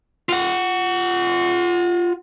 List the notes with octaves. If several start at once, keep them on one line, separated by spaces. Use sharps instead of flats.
F4 F#5